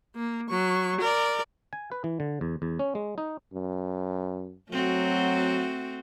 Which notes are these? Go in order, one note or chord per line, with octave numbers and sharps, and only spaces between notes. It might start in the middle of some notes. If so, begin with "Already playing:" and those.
A#3
F#3 C#6
A#4 D5
G#5
B4
E3
D3
E2
E2
C#4
G#3
D#4
F#2
F#3 A3 C4 F#4